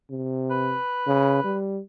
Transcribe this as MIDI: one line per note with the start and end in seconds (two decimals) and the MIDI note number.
0.11 0.77 48
0.51 1.56 71
1.06 1.43 49
1.44 1.81 55